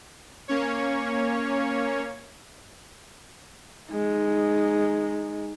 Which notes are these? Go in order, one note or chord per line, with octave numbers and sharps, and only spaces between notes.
A#3 C#4 C#5
G#3 D#4